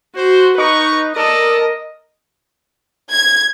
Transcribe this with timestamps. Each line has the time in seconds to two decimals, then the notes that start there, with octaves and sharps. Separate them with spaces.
0.16 F#4 C5
0.58 D#4 B4 A#5 C#6
1.16 A4 A#4 D5 D#5 A5
3.12 G#6